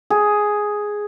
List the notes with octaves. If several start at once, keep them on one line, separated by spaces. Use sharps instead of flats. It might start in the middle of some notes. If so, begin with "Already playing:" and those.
G#4